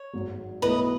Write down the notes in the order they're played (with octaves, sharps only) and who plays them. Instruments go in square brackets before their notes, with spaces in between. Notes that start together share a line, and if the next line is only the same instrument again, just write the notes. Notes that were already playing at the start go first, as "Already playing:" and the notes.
Already playing: [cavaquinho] C#5
[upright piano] G#1 G#2 F#3
[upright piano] B1 A2 F#3 B3 E4 [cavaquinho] B4 D#5